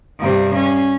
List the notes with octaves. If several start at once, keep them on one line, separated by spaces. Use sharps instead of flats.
G2 C3
C#4